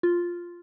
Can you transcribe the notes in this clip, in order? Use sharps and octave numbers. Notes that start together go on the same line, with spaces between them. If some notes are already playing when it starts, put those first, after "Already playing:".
F4